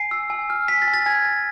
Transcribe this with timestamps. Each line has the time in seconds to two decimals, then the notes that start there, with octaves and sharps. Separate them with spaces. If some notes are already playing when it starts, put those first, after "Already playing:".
Already playing: G#5 C7
0.11 E6
0.30 G#5
0.50 F6
0.68 G#5 B6
0.82 A6
0.87 G#5
0.94 A6
1.06 G#5 G#6
1.25 G#5